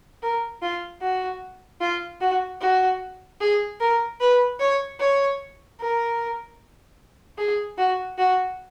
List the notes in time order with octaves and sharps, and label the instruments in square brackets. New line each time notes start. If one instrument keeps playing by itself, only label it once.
[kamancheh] A#4
F4
F#4
F4
F#4
F#4
G#4
A#4
B4
C#5
C#5
A#4
G#4
F#4
F#4